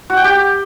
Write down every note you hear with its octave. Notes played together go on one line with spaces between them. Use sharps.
F#4
G5
G4